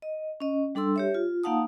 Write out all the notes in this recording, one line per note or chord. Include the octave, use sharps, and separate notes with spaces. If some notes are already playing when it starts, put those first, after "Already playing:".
D#5
C#4 D#5
G3 D4 A4 C6 E6
G4 C#5 E5
F4
A#3 D#4 F5 F#5 A5 D#6